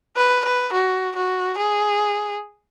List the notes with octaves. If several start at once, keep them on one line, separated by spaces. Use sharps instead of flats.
B4
B4
F#4
F#4
G#4